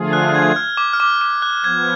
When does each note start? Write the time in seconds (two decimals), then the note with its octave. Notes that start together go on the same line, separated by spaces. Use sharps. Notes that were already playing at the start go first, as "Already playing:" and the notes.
Already playing: D3 F3 A3 F4 G#4
0.13 F#6
0.35 G#6
0.56 F6
0.77 D6
0.93 F6
1.00 D6
1.21 D6
1.42 F#6
1.64 F3 B3 G#6